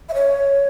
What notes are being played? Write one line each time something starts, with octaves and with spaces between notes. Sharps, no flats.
E5
C#5